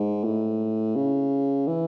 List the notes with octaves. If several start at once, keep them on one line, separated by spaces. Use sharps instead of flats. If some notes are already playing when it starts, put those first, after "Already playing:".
Already playing: G#2
A2
C#3
E3